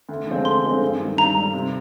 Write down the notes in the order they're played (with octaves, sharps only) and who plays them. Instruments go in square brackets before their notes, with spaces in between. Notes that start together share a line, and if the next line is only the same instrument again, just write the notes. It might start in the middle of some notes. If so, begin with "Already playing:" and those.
[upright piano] D2
D3 F3 G#3 C4
[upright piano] D2 [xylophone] C6
[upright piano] D3 F3 G#3 C4
G2
D#3 G3
[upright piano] G2 [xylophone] A#5
[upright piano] D#3 G3
C3